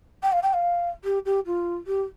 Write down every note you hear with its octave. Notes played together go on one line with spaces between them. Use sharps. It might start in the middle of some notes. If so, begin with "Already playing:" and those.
G5
F5
G5
F5
G4
G4
F4
G4